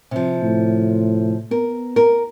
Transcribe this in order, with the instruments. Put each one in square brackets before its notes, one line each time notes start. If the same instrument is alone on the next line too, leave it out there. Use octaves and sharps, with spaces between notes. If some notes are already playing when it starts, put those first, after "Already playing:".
[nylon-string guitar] C3 F3
[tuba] A2
[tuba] B3 [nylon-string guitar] A#4
[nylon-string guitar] A#4